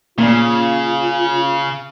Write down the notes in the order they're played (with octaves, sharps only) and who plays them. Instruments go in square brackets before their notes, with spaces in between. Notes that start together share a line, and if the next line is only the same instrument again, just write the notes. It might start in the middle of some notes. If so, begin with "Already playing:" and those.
[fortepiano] A#2 [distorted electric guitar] C#3 [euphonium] F4